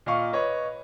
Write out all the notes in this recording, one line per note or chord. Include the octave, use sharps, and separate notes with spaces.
A#2 D#5 F5 C#6
B4 C#5 D#5